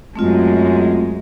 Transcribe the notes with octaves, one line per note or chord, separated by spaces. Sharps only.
F#2 G#3 A3 C4 F4